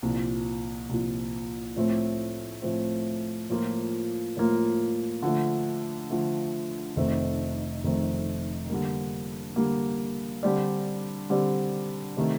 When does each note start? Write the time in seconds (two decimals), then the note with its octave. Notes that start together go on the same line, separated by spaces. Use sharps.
0.02 C2 A#2 F3
0.89 C2 A#2 F3
1.76 A2 F3 A3 C4
2.62 A2 F3 A3 C4
3.50 A2 F3 A#3 F4
4.37 A2 F3 A#3 F4
5.23 D3 F3 A3
6.10 D3 F3 A3
6.96 F1 F2 D#3 A3 C4
7.83 F1 F2 D#3 A3 C4
8.70 D3 G3 A#3
9.56 D3 G3 A#3
10.43 D3 G3 C4 G4 D5
11.30 D3 G3 C4 G4 D5
12.17 C3 D#3 A3